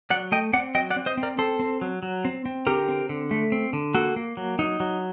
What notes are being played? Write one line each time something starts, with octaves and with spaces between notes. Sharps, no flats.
F#3 D5 F#5
A3 D#5 G5
C4 D5 F#5
F#3 D#5 G5
D5 F#5
C4
C5 D#5
C4
A#4 D5
C4 A4 C5
C4
F#3
F#3
C4
C4
D3 G4 A#4
C4
D3
A3
C4
D3
A#3 F#4 A4
A#3
F#3
F#3 D#4
F#3